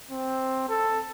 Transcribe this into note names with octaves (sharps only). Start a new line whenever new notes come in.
C4
A4